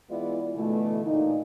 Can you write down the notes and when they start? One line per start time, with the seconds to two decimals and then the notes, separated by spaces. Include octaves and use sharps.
0.10 E3 G#3 B3 E4 F4 D5
0.56 B2 D3 E3 A3
1.05 A#2 D#4